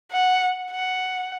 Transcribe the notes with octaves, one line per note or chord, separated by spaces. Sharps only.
F#5
F#5